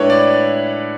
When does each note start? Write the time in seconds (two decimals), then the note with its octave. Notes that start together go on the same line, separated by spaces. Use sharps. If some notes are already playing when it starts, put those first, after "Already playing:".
Already playing: A2 G#3 D4 E4 A4 B4 C#5
0.10 D5